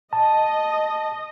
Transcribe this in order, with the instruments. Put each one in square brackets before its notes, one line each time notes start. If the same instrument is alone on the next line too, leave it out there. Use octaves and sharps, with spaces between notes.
[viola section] D#5 [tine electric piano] A5